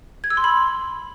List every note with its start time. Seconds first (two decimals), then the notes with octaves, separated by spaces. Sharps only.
0.24 G#6
0.30 E6
0.37 C6
0.44 B5